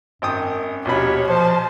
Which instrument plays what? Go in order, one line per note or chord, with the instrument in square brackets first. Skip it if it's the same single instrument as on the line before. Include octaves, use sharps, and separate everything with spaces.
[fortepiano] G#1 G5 D#6 [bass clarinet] F#2
[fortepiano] A#1 B2 B5 [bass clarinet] D#2 [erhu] C#5
[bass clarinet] F3 [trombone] C5 [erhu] A5